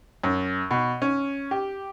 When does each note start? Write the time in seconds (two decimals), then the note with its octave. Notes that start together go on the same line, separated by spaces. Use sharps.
0.24 F#2
0.71 B2
1.02 C#4
1.51 G4